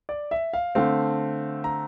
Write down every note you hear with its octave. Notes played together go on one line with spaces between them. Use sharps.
D5
E5
F5
D3 A3 C4 F5
A#5